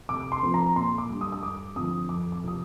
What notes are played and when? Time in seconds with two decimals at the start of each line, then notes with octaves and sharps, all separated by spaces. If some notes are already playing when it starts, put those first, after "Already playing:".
0.09 C3 D6
0.32 C6
0.43 F3 C4
0.54 A#5
0.76 A#2 C6
0.98 D6
1.09 G3 D4
1.21 D#6
1.32 D#6
1.43 G2 D6
1.76 D3 F3 C4 D#6
2.09 F2 D6
2.32 D6
2.43 C3 F3 C4 D#6